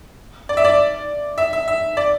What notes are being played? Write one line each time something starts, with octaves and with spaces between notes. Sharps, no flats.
D5
E5
D5
E5
E5
E5
D5